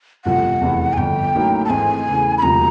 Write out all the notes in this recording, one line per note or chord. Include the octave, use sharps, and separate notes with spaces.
G1 F2 C3 F3 A3 F#5
F1 E2 C3 E3
G#5
G1 F2 D3 G5
A1 A2 F#3 A#3 D#4
A5
G#1 G#2 E3 A3 C4 G#5
E2 C#3 E3 A3
B5
E1 D2 C3 F3 A#5